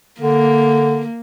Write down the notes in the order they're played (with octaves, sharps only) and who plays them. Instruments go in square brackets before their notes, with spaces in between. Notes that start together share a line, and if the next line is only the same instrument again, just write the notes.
[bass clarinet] D3 [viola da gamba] A#3